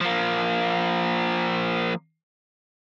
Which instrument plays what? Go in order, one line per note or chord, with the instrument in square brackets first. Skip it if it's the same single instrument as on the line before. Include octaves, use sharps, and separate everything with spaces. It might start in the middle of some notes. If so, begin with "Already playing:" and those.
[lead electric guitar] F3 A#3